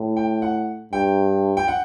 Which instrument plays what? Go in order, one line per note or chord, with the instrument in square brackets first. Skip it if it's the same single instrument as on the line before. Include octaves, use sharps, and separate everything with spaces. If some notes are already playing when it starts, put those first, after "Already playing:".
Already playing: [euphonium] A2
[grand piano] G5
F#5
[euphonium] G2 [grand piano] G5
[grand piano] G5
F#5